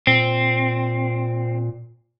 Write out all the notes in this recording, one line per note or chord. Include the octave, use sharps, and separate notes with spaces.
A#2 C4